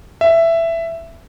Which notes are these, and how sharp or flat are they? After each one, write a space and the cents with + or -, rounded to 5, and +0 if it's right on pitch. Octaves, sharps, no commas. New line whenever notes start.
E5 +10